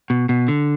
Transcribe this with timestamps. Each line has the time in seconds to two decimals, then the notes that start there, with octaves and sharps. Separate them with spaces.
0.10 B2
0.29 B2
0.48 D3